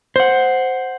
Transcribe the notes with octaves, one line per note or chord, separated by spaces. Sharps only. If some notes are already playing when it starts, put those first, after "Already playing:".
C5 F#5